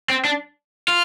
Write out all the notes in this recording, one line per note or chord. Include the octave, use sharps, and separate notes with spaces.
C4
D4
F4